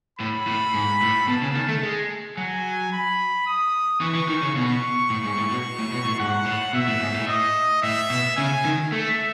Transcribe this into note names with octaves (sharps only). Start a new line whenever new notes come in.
A2 B5
A2
G#2
A2
B2 A5
C#3
D#3
A3
G#3
F#3 G#5
B5
D#6
E3 C#6
E3
D#3
C#3
B2 C#6
A2
G#2
A2
B2
A2
B2
A2
G#2 F#5
A2
B2 E5
A2
G#2
A2
D#5
A2 E5
B2
C#3 G#5
D#3
A3 E5